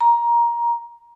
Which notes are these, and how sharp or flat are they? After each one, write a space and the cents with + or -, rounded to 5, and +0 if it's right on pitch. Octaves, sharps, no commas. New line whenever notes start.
A#5 +15